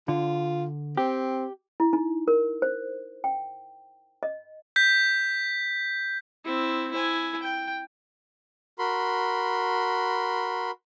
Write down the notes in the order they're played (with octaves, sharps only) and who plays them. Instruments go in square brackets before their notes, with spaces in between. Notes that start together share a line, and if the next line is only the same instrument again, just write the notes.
[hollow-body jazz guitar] D3 [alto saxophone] F4
[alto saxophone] C4 [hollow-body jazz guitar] G4
[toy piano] E4
D#4
A#4
C5
G5
D#5
[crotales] G6 B6
[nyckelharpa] C4 E4
E4 G#5
G5
[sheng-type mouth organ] F#4 A#4 B5 C6